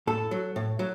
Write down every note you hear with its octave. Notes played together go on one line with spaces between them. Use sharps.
A2 A4
F#3
A2
F#3